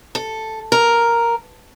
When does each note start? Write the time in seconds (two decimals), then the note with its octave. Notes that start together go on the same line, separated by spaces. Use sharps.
0.15 A4
0.72 A#4